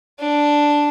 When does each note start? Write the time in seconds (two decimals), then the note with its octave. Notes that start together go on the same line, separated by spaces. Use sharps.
0.19 D4